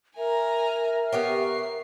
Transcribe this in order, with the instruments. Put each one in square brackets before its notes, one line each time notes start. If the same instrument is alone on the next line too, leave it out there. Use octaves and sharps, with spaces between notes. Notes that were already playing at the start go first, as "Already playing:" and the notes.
[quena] A#4 [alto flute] E5 [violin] G#5 A#5
[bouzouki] B3 G4 C#5 [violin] C7